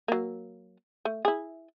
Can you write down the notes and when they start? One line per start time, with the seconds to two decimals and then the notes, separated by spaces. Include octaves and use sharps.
0.08 F#3 A#3
1.05 A3
1.25 E4 G#4